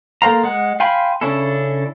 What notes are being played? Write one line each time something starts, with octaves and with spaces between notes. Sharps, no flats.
A#3 A4 C5 F5 A#5
G#3 F#5
F5 G5 G#5 B5 C6
C#3 C#4 D4 E4 A4